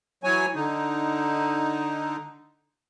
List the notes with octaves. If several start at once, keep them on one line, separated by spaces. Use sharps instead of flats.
E3 F#3 C#5 G#5
D3 D#4